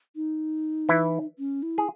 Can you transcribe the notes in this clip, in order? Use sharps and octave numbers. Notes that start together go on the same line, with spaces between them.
D#4
E3 E4
C#4
E4
G#4